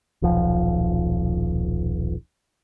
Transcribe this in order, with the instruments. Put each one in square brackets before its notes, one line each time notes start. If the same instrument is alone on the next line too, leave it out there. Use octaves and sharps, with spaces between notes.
[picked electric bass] D#1 B1 F3